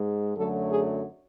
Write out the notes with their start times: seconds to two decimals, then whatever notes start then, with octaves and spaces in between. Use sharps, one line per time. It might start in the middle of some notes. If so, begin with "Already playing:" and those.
Already playing: G#2 G#3
0.37 F#2 D3 F#3 A3 A4
0.70 G#4